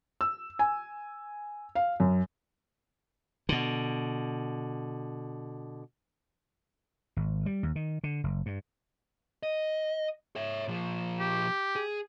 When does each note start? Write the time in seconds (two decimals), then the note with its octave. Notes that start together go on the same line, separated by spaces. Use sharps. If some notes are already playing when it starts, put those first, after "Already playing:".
0.21 E6
0.59 G#5
1.75 F5
2.00 F#2
3.49 B2 D3
7.17 G#1
7.46 G3
7.63 D#2
7.76 D#3
8.04 D3
8.24 F#1
8.46 G2
9.43 D#5
10.36 C#5 E5
10.68 A#2 F3
11.20 G4
11.76 G#4